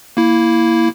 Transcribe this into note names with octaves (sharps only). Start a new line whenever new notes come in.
A#3 E4